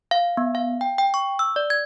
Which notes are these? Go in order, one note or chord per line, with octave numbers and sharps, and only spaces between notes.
F5
B3
F5
G5
G5
C#6
E6
D5
G#6